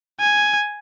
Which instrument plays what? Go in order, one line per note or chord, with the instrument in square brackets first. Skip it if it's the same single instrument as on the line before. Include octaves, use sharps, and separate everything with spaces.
[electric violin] G#5